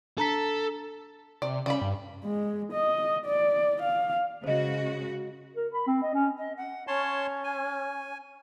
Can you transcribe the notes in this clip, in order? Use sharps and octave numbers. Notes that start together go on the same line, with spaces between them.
D4 A4 A#5 B6
C3 D5
C#3 G3 D5 B5
G2
G#3
D#5
D5
F5
C#3 G#3 F#4 C5 D#5
A#4
B5
C4
D#5
C#4
D#5
F#5
C#4 C#5 A5 C6
G#5